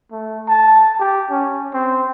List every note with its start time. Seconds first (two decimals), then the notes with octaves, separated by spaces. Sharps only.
0.12 A3
0.48 A5
1.00 G4
1.31 C#4
1.74 C4